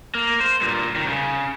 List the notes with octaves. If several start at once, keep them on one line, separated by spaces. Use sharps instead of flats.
A#3
C5
G2 A#2
C2 D#3
C#3